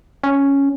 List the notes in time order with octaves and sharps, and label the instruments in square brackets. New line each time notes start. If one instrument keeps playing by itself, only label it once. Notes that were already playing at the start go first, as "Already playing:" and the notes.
[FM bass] C#4